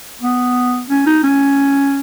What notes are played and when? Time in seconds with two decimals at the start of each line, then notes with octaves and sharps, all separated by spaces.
0.21 B3
0.89 C#4
1.07 D#4
1.24 C#4